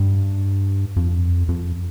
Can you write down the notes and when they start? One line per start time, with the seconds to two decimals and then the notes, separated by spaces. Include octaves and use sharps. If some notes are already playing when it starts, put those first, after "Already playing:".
Already playing: G2
0.96 F2
1.49 F2